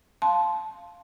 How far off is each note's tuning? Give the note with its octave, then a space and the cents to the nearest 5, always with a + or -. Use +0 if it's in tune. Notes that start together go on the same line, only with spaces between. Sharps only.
F5 +0 A5 -20 C6 +0